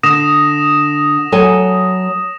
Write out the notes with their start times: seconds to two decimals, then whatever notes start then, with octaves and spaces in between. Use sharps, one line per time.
0.03 D3 D#6 A#6 E7
1.32 F#3 A4 G#5